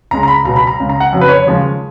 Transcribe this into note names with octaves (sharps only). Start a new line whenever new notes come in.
C#2 C#3 G#3 A#5
A#5
B5
C#2 B2 F#3 A#5
B5
A#5
C#2 C#3 G#3
A#5
F#5
F2 C#3 F#3
B4
C#5
D#2 C#3 F3 G#3